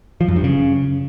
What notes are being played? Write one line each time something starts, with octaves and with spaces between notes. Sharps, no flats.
F3
F#2
G2
C#3